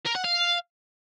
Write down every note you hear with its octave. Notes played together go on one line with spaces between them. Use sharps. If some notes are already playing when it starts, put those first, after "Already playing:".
A#4
F#5
F5